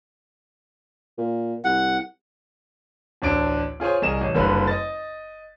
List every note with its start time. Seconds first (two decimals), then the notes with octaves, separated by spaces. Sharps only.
1.18 A#2
1.65 C2 F#5
3.22 A1 D2 D4 D7
3.80 F4 G#4 C5 C#5
4.02 C2 G#4 A#4 D#5 E7
4.21 A1
4.35 F#1 G2 D3 B4
4.67 D#5 A6